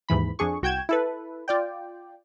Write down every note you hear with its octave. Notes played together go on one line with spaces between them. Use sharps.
D#2 G#2 E3 B5
F2 D4 G#4 C#6
C2 F#4 G5 G6 G#6 E7
E4 A4 B4
F4 D5 G5